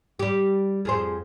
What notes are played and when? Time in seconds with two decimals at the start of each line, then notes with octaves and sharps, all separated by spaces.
0.19 G3 G4
0.85 F2 G#4 C5